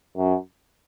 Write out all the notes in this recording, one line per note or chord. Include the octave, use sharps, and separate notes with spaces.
F#2